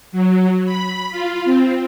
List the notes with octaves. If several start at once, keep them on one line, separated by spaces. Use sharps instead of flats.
F#3
B5
F4
C4